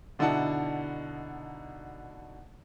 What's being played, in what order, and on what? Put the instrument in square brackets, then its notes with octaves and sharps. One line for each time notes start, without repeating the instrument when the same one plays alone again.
[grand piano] B2 D3 D#4 E4 F#5 A5